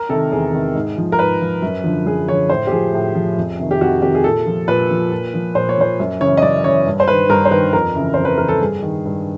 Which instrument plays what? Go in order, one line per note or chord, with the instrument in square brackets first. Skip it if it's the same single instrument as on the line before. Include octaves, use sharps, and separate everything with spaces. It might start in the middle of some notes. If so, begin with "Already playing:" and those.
Already playing: [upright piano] A#4
C3 D#3 A4
E2 G#4
C3 D#3
G#2
F3
A#4
G#2 B4
F3
F#2
D3 F3
F#2 G#4
D3 F3 C#5
A2 C5
G4
F3 G#4
A2
F3
F2
C3 D#3
G4
F2 F#4
C3 D#3 G4
G#4
A#2 A4
F3
A#2 B4
F3
A#2
F3
A#2 C5
C#5
F3 C5
F#2
C#3 E3 C#5
D#5
F#2 D5
C#3 E3 C#5
G2
C5
D#3 B4
G2 A#4
C5
D#3 B4
F2 A#4
C#3 E3
F2 C5
B4
C#3 E3 A#4
A4
G2 G#4
D#3
G2